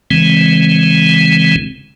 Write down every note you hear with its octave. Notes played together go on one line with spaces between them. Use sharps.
C#3 E3 G#3 C4